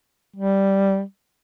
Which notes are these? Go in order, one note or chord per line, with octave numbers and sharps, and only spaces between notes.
G3